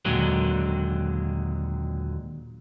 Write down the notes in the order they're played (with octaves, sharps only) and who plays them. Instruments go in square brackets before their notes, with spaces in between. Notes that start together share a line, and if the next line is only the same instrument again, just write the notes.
[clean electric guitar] D#2 A#2 D3 F#3 G#3